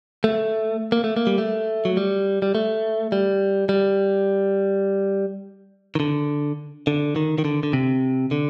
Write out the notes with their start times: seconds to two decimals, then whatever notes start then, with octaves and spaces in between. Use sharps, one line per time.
0.24 A3
0.92 A#3
1.04 A3
1.17 A#3
1.27 G3
1.38 A3
1.85 F#3
1.97 G3
2.42 G3
2.55 A3
3.12 G3
3.69 G3
5.95 D#3
6.00 D3
6.87 D3
7.16 D#3
7.38 D#3
7.45 D3
7.63 D3
7.73 C3
8.31 D3